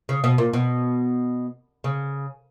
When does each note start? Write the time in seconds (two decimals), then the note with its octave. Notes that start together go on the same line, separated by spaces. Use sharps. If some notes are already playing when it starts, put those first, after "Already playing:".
0.09 C#3
0.24 B2
0.38 A#2
0.53 B2
1.84 C#3